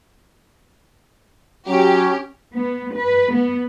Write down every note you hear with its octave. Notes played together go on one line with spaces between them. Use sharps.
F#3 C#4 G4
B3
B4
B3